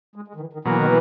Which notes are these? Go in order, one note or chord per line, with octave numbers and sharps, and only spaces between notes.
G#3
G#3
D#3
E3
D#3
B2 E3 F#3 A#3
D#3
E3